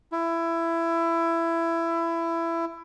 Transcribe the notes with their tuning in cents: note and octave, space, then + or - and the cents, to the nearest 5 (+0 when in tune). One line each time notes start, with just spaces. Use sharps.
E4 +20